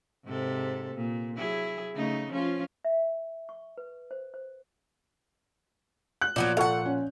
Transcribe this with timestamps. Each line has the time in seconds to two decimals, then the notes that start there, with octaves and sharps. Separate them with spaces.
0.25 G#2 C3 A4
0.95 A#2
1.37 F#3 E4 G#4
1.96 C#3 A3 D#4
2.31 F3 C#4 F4
2.85 E5
3.49 C#6
3.78 B4
4.11 C5
4.34 C5
6.21 F#6
6.36 A#2 F3 F#3 B3 D4 G6
6.57 A4 F5 F#5 C#6
6.85 C#4